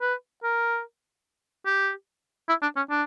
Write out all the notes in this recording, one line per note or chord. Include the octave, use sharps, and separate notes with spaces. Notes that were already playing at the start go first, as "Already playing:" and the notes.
B4
A#4
G4
E4
D4
C#4
D4